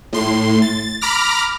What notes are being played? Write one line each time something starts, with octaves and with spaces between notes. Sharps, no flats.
A2 C6
A6
A#5 B5 D6 F6 A#6